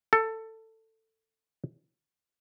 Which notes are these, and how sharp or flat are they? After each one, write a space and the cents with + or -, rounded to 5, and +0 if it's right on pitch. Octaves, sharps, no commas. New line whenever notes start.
A4 +15